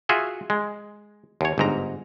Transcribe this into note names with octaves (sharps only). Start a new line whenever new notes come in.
F4 F#4 G#4 E5
G#3
D#2 C#5
G1 G#2 A#5